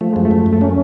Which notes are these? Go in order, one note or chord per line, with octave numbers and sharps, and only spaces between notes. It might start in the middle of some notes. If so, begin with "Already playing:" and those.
F3 A3
F#2 G#3
A3
F#2
F#2
A3
A#3 C#4